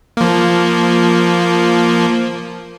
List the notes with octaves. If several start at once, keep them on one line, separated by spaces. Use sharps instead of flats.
F3 A#3